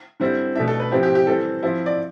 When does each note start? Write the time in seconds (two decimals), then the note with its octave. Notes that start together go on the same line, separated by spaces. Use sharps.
0.20 D3 G3 C4 E4
0.55 B2 A3 D4 E5
0.68 A4
0.80 B4
0.91 F3 C4 E4 G4
1.03 G4
1.15 G4
1.26 E3 G3 C4 A4
1.63 F3 C4 E4
1.86 D5